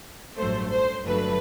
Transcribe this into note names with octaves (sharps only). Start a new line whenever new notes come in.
A1 G2 F#3 A3 C5
C5
G1 G2 F#3 A3 B4